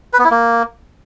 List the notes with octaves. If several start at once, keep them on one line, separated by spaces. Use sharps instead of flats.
B4
B3
E4
A#3